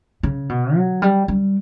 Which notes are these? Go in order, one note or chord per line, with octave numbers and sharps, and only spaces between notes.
C#3
B2
F#3
G3
G3